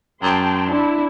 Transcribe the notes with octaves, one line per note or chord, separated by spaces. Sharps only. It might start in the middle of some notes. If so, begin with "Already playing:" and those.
F#2 G5 A5 C6
D4 E4